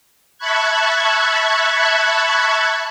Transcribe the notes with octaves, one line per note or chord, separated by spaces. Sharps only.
E5 A5 B5 C#6 F#6 G#6